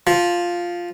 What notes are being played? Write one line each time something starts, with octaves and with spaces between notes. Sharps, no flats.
F3